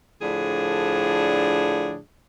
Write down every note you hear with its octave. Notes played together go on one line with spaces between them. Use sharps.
A2 D3 F3 D4 G#4